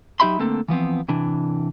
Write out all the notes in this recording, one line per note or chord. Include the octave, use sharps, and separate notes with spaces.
F#3 D#4 G4 E5 B5 C6
D3 A3 A#3 C4 A4
E3 F3 B3 C4
C3 E3 D4